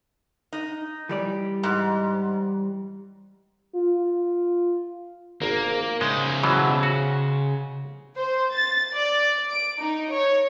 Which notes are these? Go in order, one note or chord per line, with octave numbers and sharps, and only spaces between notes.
D#4
E3 G3 D5
G#2
F4
G#1 A#3
C#3 G#3 D#4 C5
B2 E3 F#3
F#4
C5
A6
D5
D7
D#4
C#5